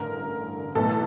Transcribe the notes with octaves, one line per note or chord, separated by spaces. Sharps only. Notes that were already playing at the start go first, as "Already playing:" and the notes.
Already playing: A1 G2 D3 A#4
B1 A2 E3 A4